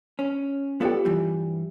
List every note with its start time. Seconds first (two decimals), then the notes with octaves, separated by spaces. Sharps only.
0.19 C#4
0.81 B3 F4 G4 A4 D5
1.05 G2 E3 G3